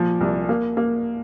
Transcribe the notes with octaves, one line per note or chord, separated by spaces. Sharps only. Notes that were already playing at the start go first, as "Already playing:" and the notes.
Already playing: A#2 F3
C2
A#3
A#3